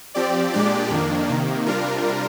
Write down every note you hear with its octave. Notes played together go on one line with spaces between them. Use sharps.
F3 C4 G4 D5
A#2 G#3 D4 G4 D5
F2 D#3 A#3 D4
C3 D#3 A#3
C3 G3 D4 F4 A#4